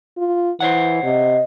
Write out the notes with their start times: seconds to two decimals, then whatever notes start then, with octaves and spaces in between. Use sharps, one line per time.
0.18 F4
0.60 E3 C5 C#5 F#5
1.03 C3 D#5